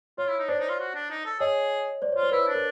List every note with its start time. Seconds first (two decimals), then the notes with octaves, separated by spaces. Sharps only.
0.18 F4 C#5
0.28 E4
0.39 D#4
0.48 D4 C5 D5
0.60 D#4
0.69 F4
0.80 F#4
0.95 D4
1.10 D#4
1.26 A4
1.40 G#4 C#5 D#5
2.02 C5 D5
2.12 C#5
2.17 F4
2.23 C5
2.32 E4 B4
2.47 D4
2.55 A#4